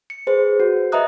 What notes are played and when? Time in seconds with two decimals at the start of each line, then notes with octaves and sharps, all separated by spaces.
0.10 C#7
0.27 G#4 B4 C5
0.60 F#4
0.92 B4 D#5 E5 A#5 D#6 F#6